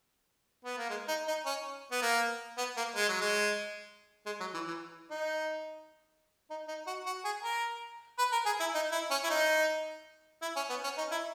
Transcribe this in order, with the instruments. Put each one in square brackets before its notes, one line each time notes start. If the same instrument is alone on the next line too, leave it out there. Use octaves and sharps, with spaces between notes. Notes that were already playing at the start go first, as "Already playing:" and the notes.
[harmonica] B3
A#3
G#3
D#4
D#4
C#4
B3
A#3
B3
A#3
G#3
F#3
G#3
G#3
F#3
E3
E3
D#4
D#4
D#4
F#4
F#4
G#4
A#4
B4
A#4
G#4
E4
D#4
E4
C#4
E4
D#4
E4
C#4
B3
C#4
D#4
E4